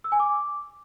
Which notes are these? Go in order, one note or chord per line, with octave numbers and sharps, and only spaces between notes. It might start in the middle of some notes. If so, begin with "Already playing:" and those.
E6
G#5
D6